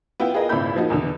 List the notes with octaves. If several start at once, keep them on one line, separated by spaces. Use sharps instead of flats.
B3 E4 F4 G5
F4 G#4 A#4 B4 D#5 G5
G#1 C#2 A#2 E4 B5 G6
F3 A#3 D#4 F#4
E2 B2 D3